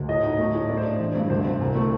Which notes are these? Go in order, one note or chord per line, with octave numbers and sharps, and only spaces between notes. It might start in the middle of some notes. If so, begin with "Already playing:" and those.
Already playing: D2
A2 D#5
D#4
A3
A2
A3 D5
C5
D4 D5
A1
G2
D2 C5
C3
C2
A3